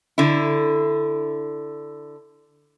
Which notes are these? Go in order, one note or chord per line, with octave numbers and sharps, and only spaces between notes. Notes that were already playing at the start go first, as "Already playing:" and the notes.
D3 E4